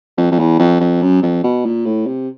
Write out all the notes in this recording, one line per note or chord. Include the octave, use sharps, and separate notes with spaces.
F2
F2
E2
F2
F2
F#2
F2
B2
A#2
A2
C3